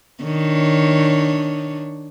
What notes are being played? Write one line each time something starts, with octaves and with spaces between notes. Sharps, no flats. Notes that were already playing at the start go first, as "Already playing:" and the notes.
D#3 D4 C#5